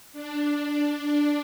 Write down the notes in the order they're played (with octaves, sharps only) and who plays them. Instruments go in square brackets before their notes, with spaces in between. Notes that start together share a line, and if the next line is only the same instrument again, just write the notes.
[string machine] D4